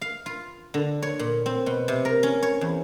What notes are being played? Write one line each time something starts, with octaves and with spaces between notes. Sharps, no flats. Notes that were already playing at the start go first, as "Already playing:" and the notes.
F5
F4
D3
C#5
A#2
C4
B2
C3
A#4
C#4
C#5
E2